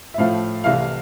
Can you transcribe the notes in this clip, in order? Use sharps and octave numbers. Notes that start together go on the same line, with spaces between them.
E5
A2 F3 A3 F5
C2 C3 E3 A3 F5